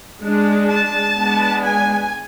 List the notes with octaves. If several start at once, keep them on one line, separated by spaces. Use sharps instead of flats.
G#3 D4
A5
G#3 B3 D4
G#5